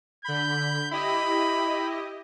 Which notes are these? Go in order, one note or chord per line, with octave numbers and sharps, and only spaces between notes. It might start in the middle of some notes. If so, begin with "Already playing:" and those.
D3 B5 G6
E4 G4 D#5 B5